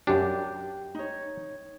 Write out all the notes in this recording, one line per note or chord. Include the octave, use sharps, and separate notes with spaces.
F#2 D4 G4
D#4 C#5